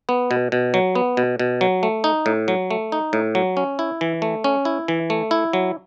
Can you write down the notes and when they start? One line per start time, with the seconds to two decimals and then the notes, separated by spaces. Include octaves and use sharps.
0.09 B3
0.31 B2
0.52 B2
0.74 F#3
0.95 B3
1.17 B2
1.39 B2
1.61 F#3
1.83 A3
2.04 D#4
2.26 A2
2.48 F#3
2.71 A3
2.92 D#4
3.13 A2
3.35 F#3
3.57 C#4
3.79 E4
4.01 E3
4.22 A3
4.44 C#4
4.65 E4
4.88 E3
5.10 A3
5.31 E4
5.53 F#3